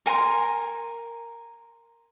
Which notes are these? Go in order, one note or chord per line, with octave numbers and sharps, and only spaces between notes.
A#4 G#5 A#5 C6